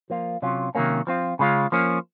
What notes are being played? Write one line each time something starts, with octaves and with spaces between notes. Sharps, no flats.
F3 A#3 F4
C3 F#3 C#4 F4
C3 D#3 F#3 A#3 C#4
F3 C4 F4
C#3 G#3 C#4 F4
F3 A#3 C#4